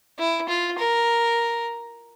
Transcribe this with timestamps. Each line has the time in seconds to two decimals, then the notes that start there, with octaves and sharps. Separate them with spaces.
0.19 E4
0.49 F4
0.78 A#4